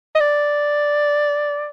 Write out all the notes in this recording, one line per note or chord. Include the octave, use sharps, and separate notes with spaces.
D#5
D5